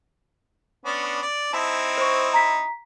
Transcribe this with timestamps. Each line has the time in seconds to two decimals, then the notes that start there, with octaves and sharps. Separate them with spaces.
0.85 B3 C#4 D4
1.22 D5
1.53 C4 D#4 E4 A5
1.98 C5 C#6
2.33 A#5 B6